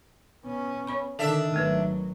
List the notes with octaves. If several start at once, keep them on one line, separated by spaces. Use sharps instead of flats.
B3 C#4
C#5 B5 C#6
D3 D#3 D4 A4 E5
G#1 F#3 A3 A#3 B4